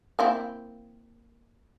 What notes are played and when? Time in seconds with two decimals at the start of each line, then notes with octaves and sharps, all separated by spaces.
0.19 A#3 C4 E4